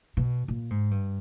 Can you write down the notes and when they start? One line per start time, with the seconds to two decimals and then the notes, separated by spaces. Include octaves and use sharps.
0.17 B2
0.48 A#2
0.70 G#2
0.91 G2